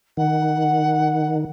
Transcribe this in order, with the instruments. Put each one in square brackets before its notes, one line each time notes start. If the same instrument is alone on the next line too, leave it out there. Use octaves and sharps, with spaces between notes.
[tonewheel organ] D#3 [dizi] F#5